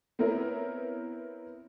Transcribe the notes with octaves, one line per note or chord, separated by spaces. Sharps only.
B3 C4 E4 A#4 C#5